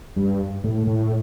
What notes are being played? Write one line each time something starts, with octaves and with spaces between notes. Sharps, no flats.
G2
A2
A2